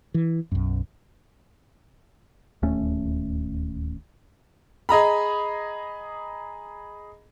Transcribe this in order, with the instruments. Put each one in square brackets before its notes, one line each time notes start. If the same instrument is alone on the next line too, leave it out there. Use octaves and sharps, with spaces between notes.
[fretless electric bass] E3
B1 F#2
[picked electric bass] D1 D#2 A3 C#4
[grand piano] G#4 D#5 A#5 B5